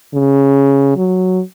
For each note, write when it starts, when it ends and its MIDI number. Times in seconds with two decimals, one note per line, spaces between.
0.14 0.94 49
0.97 1.40 54